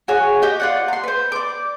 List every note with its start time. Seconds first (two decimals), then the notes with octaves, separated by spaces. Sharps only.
0.08 F#4 G#4 C#5 G#5
0.42 D#4 G4 D#5
0.60 F4 D5 F#5
0.88 A#5 C6
1.04 B4 C5
1.32 D5 D6